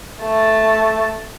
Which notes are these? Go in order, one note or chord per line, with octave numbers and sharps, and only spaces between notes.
A3 A5